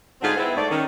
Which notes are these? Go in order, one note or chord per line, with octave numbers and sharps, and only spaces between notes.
G#2 D3 C4 F4 F#4 G#4
B3 C4 E4
G#2 A3 C#5 D5
D#3 C#4